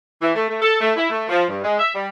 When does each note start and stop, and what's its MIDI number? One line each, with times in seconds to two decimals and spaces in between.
0.22 0.30 52
0.35 0.46 57
0.49 0.57 57
0.61 0.79 69
0.81 0.91 57
0.96 1.08 64
1.09 1.27 57
1.29 1.44 53
1.49 1.61 43
1.63 1.75 56
1.79 1.89 76
1.95 2.08 55